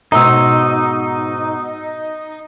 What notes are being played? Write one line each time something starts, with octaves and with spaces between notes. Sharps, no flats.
G#2 B2 D#4 A#5 E6